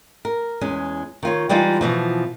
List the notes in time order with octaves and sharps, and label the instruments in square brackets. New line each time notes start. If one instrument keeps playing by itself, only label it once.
[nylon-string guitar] A#4
E2 G#3 C#4
D#3 F4 C#5
E3 G3 G#3 D#4 F4
B2 E3 F3